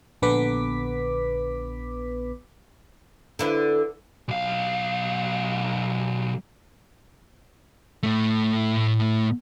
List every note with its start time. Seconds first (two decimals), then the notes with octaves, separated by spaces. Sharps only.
0.22 A#1 D3 B3 B4 D6 B6
3.39 D3 E4 B4
4.28 B1 F5
8.03 A2 A3